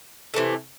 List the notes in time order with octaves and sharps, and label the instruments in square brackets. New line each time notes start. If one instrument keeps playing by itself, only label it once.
[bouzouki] C3 E3 A3